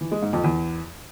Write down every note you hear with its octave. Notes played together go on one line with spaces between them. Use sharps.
E3
G#3
G#2
F2
E2